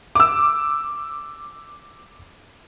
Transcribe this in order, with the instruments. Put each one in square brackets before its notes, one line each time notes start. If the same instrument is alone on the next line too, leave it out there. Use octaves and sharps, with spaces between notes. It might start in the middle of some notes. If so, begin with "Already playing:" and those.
[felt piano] D6 E6